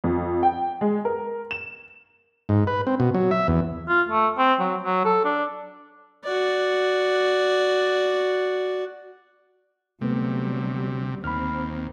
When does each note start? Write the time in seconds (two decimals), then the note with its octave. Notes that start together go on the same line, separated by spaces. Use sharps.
0.04 F2
0.43 G5
0.81 G#3
1.05 A#4
1.51 E7
2.49 G#2
2.67 B4
2.87 C4
3.00 B2
3.15 F#3
3.31 E5
3.48 E2
3.88 F4
4.09 A3
4.38 C4
4.59 F#3
4.82 F#3
5.05 A4
5.24 D4
6.25 F#4 D5
10.01 D2 C3 F#3 G3 A3 B3
11.24 D#2 C4 B5 F6